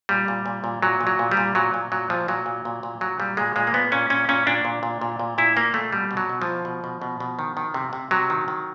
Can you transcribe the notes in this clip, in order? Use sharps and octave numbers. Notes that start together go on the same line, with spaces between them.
A#2 G3
A#2
A#2
A#2
A#2 F#3
A#2
F#3
A#2
G3
A#2
A#2 F#3
A#2
A#2 F#3
A#2 F3
A#2 F#3
A#2
A#2
A#2
A#2 F#3
A#2 G3
A#2 G#3
A#2 G#3
A#3
A#2 B3
A#2 C#4
A#2 C#4
A#2 C#4
A#2 D4
A#2
A#2
A#2
A#2
A#2 E4
A#2 A#3
A#2 A3
B2 G3
B2
F#3
B2
F3
B2
B2
B2
B2
B2
D#3
D#3
C3
C3
C3 F#3
D#3
D#3